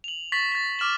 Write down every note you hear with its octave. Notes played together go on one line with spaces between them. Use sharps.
F7 F#7
C#6 A6 B6 F#7
A6 B6
D6 F6 E7 F#7